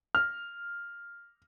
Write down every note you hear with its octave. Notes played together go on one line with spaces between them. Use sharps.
F6